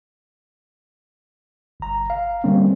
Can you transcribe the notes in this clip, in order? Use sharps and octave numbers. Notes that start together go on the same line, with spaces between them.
G1 A#5
F5
D3 G3 A#3 C4 C#4